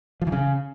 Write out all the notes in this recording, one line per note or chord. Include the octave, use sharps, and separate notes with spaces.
F3
E3
C#3